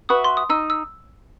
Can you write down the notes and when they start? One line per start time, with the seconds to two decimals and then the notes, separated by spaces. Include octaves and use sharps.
0.09 F#4 B4 E5 D#6
0.24 C6
0.37 D#6
0.49 D#4 E6
0.70 E6